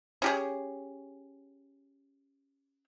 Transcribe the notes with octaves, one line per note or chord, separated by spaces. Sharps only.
C#4 G4 G#4